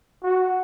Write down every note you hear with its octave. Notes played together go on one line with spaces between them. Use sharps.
F#4